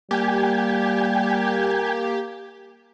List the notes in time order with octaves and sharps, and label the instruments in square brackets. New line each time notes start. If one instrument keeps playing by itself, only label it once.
[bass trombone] G3 [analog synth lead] A#3 [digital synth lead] G4 [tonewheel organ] G5 G#5